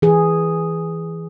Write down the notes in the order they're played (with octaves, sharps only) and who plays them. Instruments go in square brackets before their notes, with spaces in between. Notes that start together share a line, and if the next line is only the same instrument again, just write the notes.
[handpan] E3 G#4